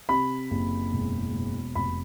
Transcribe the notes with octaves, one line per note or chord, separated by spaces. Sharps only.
C3 B5
F#1
E1
E1
F1 B5